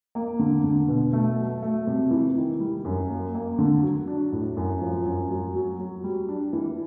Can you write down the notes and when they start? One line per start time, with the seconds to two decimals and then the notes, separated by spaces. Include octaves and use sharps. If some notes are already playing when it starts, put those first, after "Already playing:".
0.15 A#3
0.39 D3
0.64 D3
0.88 B2
1.13 A3
1.38 F#3
1.62 A3
1.87 C3
2.11 E3
2.36 D#3
2.60 G3
2.85 F#2
3.09 A#3
3.34 A#3
3.58 D3
3.83 F#3
4.07 D4
4.32 A2
4.57 F#2
4.81 F3
5.06 F#2
5.30 F#3
5.55 F#3
5.79 F#3
6.04 G3
6.29 D4
6.53 E3